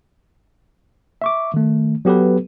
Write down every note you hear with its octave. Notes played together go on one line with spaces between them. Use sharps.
E5 C#6 D6
D#3 A3
F#3 B3 G4 A4 B4